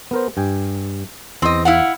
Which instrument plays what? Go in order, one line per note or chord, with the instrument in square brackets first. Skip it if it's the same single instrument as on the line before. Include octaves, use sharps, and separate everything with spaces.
[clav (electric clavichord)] B3 A#4 C5
G2 G5 G#5
[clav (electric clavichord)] E2 [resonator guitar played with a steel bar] C4 D#5
[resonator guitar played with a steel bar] E4 F5 F#5